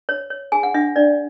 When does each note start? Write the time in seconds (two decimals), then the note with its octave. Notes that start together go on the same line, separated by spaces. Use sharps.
0.09 C#5
0.30 C#5
0.52 G#4 G#5
0.63 F#5
0.74 D4 E5
0.96 D4 D5